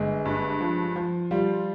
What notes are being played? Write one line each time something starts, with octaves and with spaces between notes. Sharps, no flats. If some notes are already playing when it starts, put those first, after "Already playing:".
Already playing: G1 G#3
G2
F3
F3
G3 F4